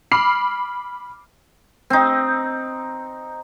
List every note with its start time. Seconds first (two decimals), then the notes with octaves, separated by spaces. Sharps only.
0.11 B5 D6 F6 C7
1.90 C4 D#4